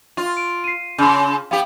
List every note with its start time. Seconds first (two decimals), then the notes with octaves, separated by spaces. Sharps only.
0.17 F4
0.37 D7
0.64 C7 D#7
0.98 C#3 C6 F6 G6
1.51 B3 G4 F5